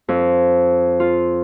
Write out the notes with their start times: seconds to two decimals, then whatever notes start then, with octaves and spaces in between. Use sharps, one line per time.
0.08 F2
1.00 F4